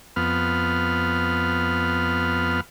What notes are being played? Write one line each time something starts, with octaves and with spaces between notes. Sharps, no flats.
F2 B3 F6